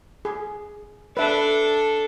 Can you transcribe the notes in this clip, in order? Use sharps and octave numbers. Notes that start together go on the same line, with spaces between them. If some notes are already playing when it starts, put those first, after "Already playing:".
G#4
D4 A4 B4 E5